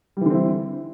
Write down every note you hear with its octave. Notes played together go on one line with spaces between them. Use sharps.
D3 E3 G3 C4 E4